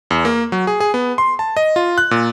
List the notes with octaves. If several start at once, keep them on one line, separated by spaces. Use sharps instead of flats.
E2
A#3
F#3
G#4
G#4
B3
C6
A5
D#5
F4
F#6
A#2